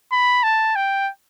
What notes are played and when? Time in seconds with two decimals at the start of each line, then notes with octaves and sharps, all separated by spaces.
0.12 B5
0.43 A5
0.76 G5